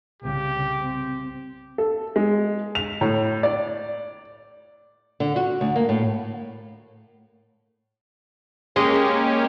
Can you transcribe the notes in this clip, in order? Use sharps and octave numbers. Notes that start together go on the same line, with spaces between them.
C2 C#3 G4
C4
A4
G#3
F7
A2
D5
D3
F#4
D2
A#3
A2
G#3 A#3 C#4 G4 D#5